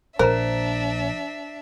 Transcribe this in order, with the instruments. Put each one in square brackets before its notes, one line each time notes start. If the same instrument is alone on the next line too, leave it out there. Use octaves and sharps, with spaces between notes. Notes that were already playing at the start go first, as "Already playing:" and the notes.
[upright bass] A#1 [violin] D4 E5 [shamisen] A#4 [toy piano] C5 A#5